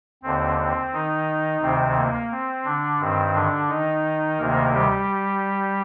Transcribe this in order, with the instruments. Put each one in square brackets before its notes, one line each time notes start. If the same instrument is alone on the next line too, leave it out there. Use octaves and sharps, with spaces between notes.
[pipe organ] D#2 D3 C4
C4
D#3 D#4
D2 C3 D#3 C4
A#3
C4
D3 D4
G2 D#3 C4
D3 D4
D#3 D#4
D2 C3 D#3 A#3 A#4
G3 G4